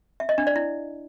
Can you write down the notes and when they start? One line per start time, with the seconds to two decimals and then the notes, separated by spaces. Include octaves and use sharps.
0.20 E5
0.29 D#5
0.38 D4
0.47 D5
0.56 E4